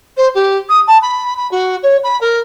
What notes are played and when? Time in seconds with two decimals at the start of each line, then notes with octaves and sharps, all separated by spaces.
0.17 C5
0.35 G4
0.69 D#6
0.87 A5
1.02 B5
1.37 B5
1.51 F#4
1.83 C#5
2.04 B5
2.21 A#4